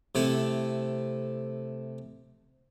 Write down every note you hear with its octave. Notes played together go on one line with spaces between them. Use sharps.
C3 A3 E4